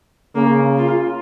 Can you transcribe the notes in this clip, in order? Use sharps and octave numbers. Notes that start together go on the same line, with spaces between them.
C#3 A#3
F4